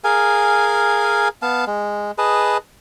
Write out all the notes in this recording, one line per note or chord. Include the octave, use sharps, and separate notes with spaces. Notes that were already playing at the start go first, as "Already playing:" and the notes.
G#4 A#4 F5 G#5
B3 F5 A5
G#3
G#4 B4 D#5 A5